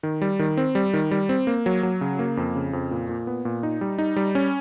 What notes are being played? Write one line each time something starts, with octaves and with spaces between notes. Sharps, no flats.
D#3
G3
D#3
C4
G3
D#3
G3
C4
A#3
F#3
F#3
C#3
A#3
F2
C#3
F2
A#2
A#2
B3
A#2
D#4
G3
D#4
G3
C#4